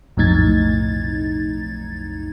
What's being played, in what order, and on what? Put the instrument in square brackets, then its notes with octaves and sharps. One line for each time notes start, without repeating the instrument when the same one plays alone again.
[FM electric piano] B1 F2 A2 D#4 G#6 A6